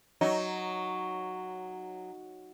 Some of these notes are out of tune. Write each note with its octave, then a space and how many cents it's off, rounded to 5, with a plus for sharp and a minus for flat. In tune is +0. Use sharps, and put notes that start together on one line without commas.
F#3 +0 D#4 +0